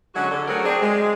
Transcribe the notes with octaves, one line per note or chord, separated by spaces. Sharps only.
D3 F#3 G#3 C#4 F#4
D3
F#3 A3 C4 F#4 G#4 A#4
C4 D4 G#4
G#3